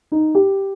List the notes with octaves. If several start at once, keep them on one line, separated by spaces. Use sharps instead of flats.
D#4
G4